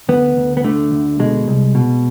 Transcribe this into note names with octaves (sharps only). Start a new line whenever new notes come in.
D2 B3
D2
B3
D3 A3
D2
B2 G#3
C2
B2